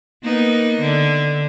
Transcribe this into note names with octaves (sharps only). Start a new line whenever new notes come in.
A#3 B3 D#4
D3